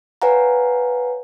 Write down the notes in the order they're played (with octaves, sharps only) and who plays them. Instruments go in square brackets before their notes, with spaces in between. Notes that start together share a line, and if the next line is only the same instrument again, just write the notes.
[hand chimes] B4 C#5 F5 F#5 G#5 A#5